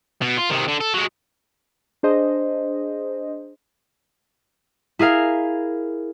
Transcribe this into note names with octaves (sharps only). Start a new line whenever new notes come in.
B2
F4
C3 D#3
D3
A4
F#3 G#3
D4 G#4 C5 D#5
E4 G#4 A#4 F5 G#5